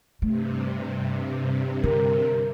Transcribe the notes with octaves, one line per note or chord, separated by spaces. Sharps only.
G2 C3 A3
D3 A#4